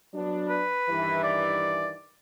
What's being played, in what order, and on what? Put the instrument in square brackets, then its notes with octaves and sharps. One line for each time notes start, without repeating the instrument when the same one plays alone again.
[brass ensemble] F#3 B3 D4
[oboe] B4
[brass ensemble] G2 D#3 E3
[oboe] D5